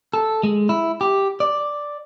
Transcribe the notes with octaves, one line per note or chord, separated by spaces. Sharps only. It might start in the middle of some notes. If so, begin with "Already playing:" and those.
A4
G#3
E4
G4
D5